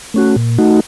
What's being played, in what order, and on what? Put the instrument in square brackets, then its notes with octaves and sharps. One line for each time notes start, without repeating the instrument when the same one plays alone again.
[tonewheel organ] A3 C#4 F#4
A#2
A3 D#4 F#4